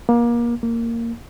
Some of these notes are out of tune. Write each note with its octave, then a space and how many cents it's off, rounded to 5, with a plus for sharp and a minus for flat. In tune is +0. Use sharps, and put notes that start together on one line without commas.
A#3 +30
A#3 -10